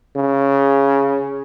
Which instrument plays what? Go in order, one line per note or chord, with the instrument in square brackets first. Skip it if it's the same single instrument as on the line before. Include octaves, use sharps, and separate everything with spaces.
[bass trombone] C#3